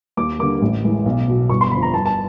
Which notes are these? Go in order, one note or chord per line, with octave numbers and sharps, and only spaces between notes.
D#2 D6
D3 G3 A#3 D6
A1
A2 E3 G#3
B1
B2 F#3
G1 C#6
C6
F2 D3 B5
A#5
G1 A5
A5